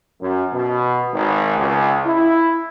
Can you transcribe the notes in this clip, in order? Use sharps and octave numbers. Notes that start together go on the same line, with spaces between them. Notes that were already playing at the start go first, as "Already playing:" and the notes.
F#2
B2
G#1
C#2
E4